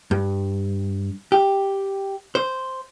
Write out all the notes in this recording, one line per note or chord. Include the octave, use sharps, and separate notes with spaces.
G2
G4
C5